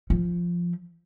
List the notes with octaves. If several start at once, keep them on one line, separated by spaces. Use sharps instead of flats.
F3